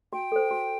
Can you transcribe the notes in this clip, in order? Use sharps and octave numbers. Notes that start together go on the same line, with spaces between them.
F#4 G5
A4 C5
F#4